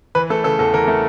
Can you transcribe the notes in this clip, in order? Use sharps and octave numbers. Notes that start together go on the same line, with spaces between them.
E3 B4
A3 A4
C#3 A4
E2 A4
E3 A#4
A3